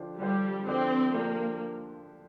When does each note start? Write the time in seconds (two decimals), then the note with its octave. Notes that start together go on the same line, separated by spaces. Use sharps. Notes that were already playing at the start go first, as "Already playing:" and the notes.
Already playing: D3 F3 D4 G4 C5
0.20 D3 F3 G3 D4 G4 C5
0.67 D3 F3 C4 D4 G4 C5
1.14 D3 F3 A#3 D4 G4 C5